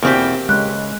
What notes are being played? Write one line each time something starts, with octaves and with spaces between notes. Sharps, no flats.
E2 B2 A#3 C4 G4
C#2 G#3 F#6